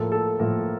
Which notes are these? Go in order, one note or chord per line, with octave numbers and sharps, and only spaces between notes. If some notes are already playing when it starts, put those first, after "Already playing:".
Already playing: A2 F3 A#3 A4
A4
A2 F3 A#3 A#4